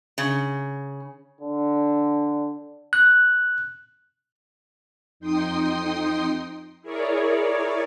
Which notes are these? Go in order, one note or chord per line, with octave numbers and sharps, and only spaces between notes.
C#3
D3
F#6
F2 D#4 G5 C6 D#6 C7
E4 G#4 A#4 C#5 D5